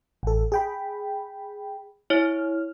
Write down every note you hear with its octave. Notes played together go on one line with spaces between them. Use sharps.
A1 A4
G#4 G5 B5
E4 C#5 F6